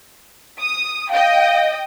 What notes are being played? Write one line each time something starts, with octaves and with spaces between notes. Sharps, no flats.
D#6
D#5 F5 G5